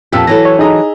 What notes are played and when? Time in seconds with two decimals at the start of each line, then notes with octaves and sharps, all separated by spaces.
0.12 F2 A#2 G4 A5 E6 B6
0.27 E3 F#3 A4 A#6
0.45 C#5
0.59 D#4 G#4 D#5 A#5